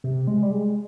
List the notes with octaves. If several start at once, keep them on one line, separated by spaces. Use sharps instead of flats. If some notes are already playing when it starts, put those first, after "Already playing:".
C3
G#3
G3
G#3